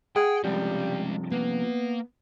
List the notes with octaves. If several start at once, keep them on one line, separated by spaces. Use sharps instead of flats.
G#4 F#5 G5
G2 C3 F3 G3 G#3 C#4
A#3 B3